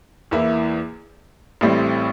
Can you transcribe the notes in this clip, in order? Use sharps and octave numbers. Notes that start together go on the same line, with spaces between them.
E2 E3 A#3 E4
A1 A2 G3 C4